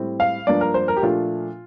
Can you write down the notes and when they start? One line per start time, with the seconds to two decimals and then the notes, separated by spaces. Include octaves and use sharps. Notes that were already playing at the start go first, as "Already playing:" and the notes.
Already playing: A2 G3 C4
0.20 F5
0.47 G2 F3 A#3 D4 D5
0.61 A#4
0.74 C5
0.88 A#4
0.97 G4
1.02 A#2 F3 A3 D4 F4